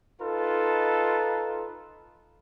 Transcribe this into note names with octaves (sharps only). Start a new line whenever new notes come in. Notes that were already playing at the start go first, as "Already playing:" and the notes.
D#4 F4 A4 B4